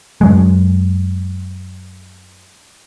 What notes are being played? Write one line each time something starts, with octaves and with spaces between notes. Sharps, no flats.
F#2 F#3 G#3